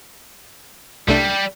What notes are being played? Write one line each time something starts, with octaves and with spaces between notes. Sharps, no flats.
C2 G3 A3 D4